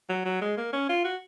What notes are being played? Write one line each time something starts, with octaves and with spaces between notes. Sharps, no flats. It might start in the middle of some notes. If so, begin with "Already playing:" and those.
F#3
F#3
G#3
A#3
C#4
F4
F#4